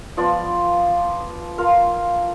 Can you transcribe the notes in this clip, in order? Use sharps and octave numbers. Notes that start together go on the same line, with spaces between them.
F3 B3 F4 D5
F4 A#4 F5